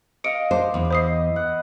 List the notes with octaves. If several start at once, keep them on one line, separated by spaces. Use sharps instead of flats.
D#5 F5 C#7 D7
D4 C5
E2
E4 C5 D#5 D#6 C7
F#5